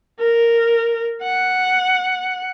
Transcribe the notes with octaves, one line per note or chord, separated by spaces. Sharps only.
A#4
F#5